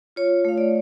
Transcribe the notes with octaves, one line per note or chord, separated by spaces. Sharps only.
F4 C#5
A3 F5
D5